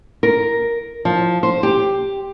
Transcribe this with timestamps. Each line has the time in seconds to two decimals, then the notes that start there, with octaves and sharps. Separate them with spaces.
0.23 A#4
1.05 F3
1.43 C5
1.63 G4